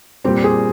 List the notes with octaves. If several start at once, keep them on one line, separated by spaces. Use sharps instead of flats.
A#2 G3 C4 G4
G#4